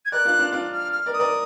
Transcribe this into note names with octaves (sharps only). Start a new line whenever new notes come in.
G#6
A#4 D5 F#6
D4 F4
D4 F4
D4 F4 F#6
F6
F6
A#4 D5
D#6
A#4 D5